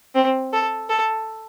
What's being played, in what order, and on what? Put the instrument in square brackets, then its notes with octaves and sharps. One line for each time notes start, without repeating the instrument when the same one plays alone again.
[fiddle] C4
A4
A4